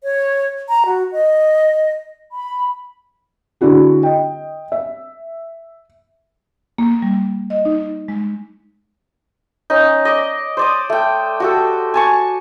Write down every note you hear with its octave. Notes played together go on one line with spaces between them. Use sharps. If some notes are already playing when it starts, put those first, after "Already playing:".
C#5
A#5
F#4
D#5
B5
D3 D4 E4 F#4 G#4
D#5 G5
E5
A#3
G3
D#5
D#4
G#3
C#4 D#4
D5 D#5
C5 D5 D#6
A3 G5
F#4 G4 A4
G#5 A5 C#6